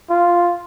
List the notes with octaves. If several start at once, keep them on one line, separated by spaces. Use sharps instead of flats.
F4